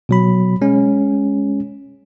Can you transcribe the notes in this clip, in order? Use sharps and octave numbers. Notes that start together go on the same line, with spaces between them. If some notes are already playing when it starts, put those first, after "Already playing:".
B2 F#3 B5
G#3 C#4